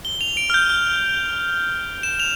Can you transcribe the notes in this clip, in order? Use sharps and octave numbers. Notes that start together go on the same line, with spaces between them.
G7
F7
D7
F6
G6
F6
E7
F7